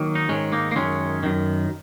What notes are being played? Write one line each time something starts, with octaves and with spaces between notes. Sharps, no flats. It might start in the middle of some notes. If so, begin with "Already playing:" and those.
Already playing: D#3 F#3 A#3
D#4
G#2 D#3 G#3 C#4
A#3 D#4
A#3
F#2 D#3 G#3 C#4
F#2 D#3